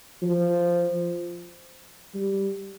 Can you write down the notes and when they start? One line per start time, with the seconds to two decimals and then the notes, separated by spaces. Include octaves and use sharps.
0.22 F3
2.14 G3